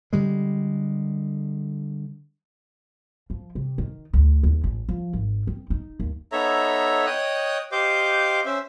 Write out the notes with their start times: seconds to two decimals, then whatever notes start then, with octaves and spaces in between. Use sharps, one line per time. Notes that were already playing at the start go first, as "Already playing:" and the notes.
0.13 D3 G3 G#3
3.30 F3
3.55 C3
3.78 D#3
4.13 D2
4.43 D#2
4.64 A1
4.89 F3
5.13 G#1
5.47 C4
5.70 D#4
6.00 D#2
6.32 B3 D#4 A4 C#5 E5 A#5
7.06 C#5 D#5 G5 D#6 F#6
7.72 G4 C5 D#5 F5 D6 G6
8.45 C#4 C5 E5